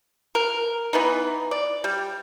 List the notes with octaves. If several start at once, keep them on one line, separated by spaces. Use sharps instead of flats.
A#4
E3 B3 D#4
D5
G3